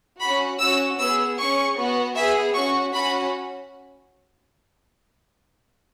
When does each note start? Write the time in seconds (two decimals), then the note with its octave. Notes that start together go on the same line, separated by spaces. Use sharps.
0.20 C#4 F#4 B5
0.59 C#4 F#4 E6
0.98 B3 G#4 E6
1.37 C#4 G#4 C#6
1.77 B3 F#4
2.15 B3 G#4 E5
2.54 C#4 F#4 C#6
2.93 C#4 F#4 B5